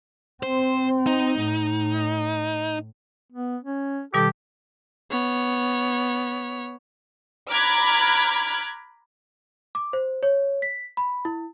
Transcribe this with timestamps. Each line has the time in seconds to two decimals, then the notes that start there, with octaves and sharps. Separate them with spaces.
0.43 C4 C5
1.07 D#4
1.40 A2
3.32 B3
3.64 C#4
4.14 B2 D#3 G3 G4 A4
5.11 B3 C#5
7.51 A#5 B5 D6 F6 F#6 G#6
9.75 D6
9.93 C5
10.23 C#5
10.62 B6
10.97 B5
11.25 E4